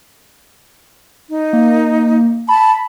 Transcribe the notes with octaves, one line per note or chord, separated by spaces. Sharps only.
D#4
A#3
A5 B5